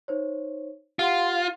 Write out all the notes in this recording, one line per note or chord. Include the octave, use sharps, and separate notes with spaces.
D#4 C5 C#5
F4 G4 F#5 C6